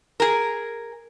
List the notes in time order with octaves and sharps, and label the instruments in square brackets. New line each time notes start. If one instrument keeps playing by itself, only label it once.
[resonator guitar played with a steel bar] G#4 A#4